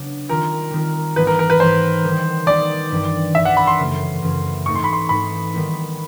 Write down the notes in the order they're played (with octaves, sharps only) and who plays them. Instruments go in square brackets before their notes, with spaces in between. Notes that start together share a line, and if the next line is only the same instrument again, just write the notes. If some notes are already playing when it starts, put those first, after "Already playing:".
Already playing: [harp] C#3 F#3 B3 D4
[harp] D#3 G3 C4 F4 [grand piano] A#4
[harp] D#3 G3 C4 F4
[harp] G#2 E3 G3 B3 [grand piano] B4
[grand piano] A#4
A#4
B4
[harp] G#2 E3 G3 B3 [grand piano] C5
[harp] D#3 G3 B3 D#4
[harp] D#3 G3 B3 D#4 [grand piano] D5
[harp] G2 E3 G3 C4
[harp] G2 E3 G3 C4 [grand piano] E5
[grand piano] F#5
B5
C6
[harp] F#2 C#3 E3 A3
F#2 C#3 E3 A3
[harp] G#2 E3 A3 C4 D#4 [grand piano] C#6
[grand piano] C6
B5
C6
[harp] G#2 E3 A3 C4 D#4 [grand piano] B5
[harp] D#3 G3 B3 E4